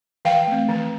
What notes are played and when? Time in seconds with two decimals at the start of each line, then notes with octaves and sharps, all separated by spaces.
0.25 E3 F5 G5
0.47 A3 C4
0.69 E3